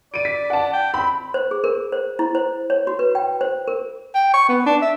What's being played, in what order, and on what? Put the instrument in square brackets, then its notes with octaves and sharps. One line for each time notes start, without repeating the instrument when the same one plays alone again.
[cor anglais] D5 [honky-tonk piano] D7 D#7
[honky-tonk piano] B6
F#5 A5
[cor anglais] G5
[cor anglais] C4 [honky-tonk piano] B5
[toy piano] C5
G#4
A#4
C5
E4
C5
C#5
F#4
B4
G5
C5
A#4
[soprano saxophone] G5
C#6
B3
D4
E5